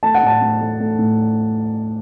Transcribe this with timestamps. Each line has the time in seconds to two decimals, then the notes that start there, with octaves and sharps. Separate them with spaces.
0.03 A3 A5
0.14 F#5
0.23 A2 A5
0.41 A2
0.61 A3
0.80 A3
0.98 A2